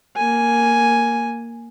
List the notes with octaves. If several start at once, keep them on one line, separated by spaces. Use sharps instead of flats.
A#3 G#5